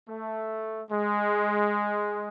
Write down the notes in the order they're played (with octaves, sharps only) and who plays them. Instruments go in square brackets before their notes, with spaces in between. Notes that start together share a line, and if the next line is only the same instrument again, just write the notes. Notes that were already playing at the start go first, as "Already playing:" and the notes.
[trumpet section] A3
G#3